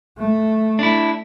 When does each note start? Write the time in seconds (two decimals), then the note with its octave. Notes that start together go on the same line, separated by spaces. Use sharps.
0.18 A3
0.79 D4 E4